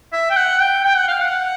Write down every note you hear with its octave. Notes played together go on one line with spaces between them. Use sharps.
E5
G5
F#5
G5
G5
F#5
F5
F#5